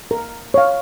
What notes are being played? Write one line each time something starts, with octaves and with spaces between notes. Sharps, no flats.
A#4
C#5 F5